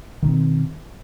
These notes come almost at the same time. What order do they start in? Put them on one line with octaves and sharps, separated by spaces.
D#3 B2 C4